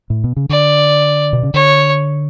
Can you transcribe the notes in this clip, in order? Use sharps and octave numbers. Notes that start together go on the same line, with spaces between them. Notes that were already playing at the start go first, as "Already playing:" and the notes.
A2
B2
C#3
D3 D5
B2
C#3
D3 C#5